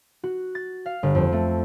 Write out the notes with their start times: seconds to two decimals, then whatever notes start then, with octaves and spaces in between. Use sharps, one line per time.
0.23 F#4
0.55 A6
0.86 F5
1.03 G1
1.15 F2
1.32 A3